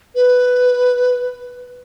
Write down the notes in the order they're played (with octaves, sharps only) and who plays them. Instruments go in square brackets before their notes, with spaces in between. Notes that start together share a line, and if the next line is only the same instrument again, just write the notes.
[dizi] B4